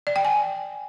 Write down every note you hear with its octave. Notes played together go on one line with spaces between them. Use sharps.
D5
G5
G#5